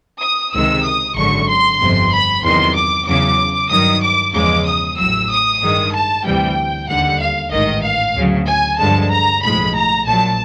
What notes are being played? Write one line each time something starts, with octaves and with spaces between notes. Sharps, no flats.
D#6
C#2 C3 D#3 G#3 E6
D#6
G#1 F#2 D3 F#3 C#6
C6
G1 F2 C3
B5
E2 C3 D#3 F#3 C6
D6
E2 C#3 F#3 D6
G2 D#3 F#3 D#6
D6
E2 C#3 F3 G#3 D6
D#6
A1 A2 F#3 E6
D#6
G2 D#3 G#3
A5
D2 C3 E3 G3 G5
D#2 D3 G3 F#5
F5
A1 G#2 D#3 D#5
F5
D2 C#3 F#3
G#5
G2 D3 F3 G#3 A5
A#5
B1 A2 F3 G#3 B5
A#5
A#1 A#2 F#3 A5